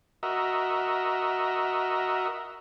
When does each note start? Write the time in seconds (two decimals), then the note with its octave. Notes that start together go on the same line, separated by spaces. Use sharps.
0.23 F#4 A#4 D#5 E5